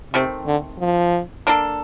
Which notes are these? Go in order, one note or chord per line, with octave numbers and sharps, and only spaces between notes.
C3 D#3 A3 C4
D3
F3
A#3 D4 A4